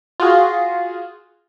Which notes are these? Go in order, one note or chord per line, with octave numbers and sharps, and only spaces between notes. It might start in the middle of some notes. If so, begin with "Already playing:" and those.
F4 F#4 G#4